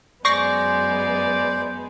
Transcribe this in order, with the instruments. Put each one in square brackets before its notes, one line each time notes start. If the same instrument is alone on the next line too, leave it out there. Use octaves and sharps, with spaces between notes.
[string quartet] F#2 G#3 B3 [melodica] C5 [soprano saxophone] D5 [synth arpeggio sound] C#6 A#6 C7